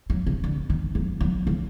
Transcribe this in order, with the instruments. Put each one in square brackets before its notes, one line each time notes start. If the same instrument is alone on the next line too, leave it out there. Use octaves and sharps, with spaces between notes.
[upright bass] F#3
C3
D3
D#3
F#3
F#3
D#3